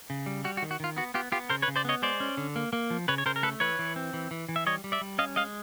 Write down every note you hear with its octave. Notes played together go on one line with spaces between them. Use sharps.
C#3
G3
G3 F#4
F#4
D#3
F#4
D#3 F4
B3 F#4
B3 F4 G4
B3 F4 G4
C#3 A#4 C5
B4 C#5
C#3
C5 D5
B3 C#5 D#5
G#3 C5 D5
C#4
D3
A#3
A#3
F3
C#3 B4 C#5
C#5
C#3 A#4 C5
A#4
A3 A4 B4
E3 B4 C#5
E3
C4
E3
E3
E3
E5
G3 C#5 D#5
G3
D5 E5
G3
C#4 D#5 F5
G#3 D#5 F5